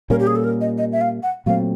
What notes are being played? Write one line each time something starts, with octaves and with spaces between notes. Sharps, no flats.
A#2 G3 A#3 C#4 A#4
G4
G#4
A4
A#4
D#5
D#5
E5
F5
F#5
A#2 F#3 A3 C4 F5